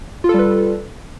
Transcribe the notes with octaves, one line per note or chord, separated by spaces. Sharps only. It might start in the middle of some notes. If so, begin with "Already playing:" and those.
G3 F4 A4 B4